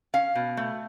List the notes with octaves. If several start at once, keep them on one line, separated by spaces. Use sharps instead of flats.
C#4 F5
B2
A3